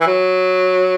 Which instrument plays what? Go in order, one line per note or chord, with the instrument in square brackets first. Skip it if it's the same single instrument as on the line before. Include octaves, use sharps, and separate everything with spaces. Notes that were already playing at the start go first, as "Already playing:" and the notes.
[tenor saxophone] E3
F#3